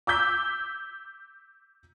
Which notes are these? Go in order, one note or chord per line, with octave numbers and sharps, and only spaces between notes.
D6 E6 G6 B6